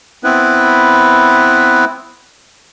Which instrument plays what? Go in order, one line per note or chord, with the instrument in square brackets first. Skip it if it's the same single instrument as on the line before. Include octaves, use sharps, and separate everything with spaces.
[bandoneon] B3 C4 E4 B4